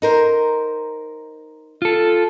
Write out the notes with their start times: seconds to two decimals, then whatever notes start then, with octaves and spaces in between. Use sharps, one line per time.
0.02 D#4 A#4 C5
1.82 F4 A4